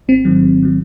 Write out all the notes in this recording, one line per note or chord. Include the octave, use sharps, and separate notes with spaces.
G#1 C4
G#2 D#3 F#3
G#1
D#3 F#3